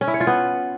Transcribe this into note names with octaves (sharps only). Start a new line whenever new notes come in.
C#4
E4
C#5
F4
B3